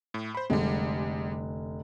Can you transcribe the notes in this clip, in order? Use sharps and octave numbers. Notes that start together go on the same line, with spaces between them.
A2
C5 B5
F1 D3 G3 G#3